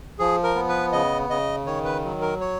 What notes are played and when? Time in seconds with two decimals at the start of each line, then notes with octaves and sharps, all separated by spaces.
0.19 F3 G#4
0.44 A#4
0.55 B3
0.69 B4
0.92 C#3 D#5
1.30 C#3 D#5
1.66 D#3 C#5
1.85 B4
2.04 F#3
2.22 A#4
2.41 C#5